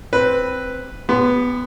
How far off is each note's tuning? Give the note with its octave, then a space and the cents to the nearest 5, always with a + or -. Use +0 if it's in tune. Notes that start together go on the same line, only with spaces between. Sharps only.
C4 +0 B4 +0
B3 +5 G4 +40 C6 -25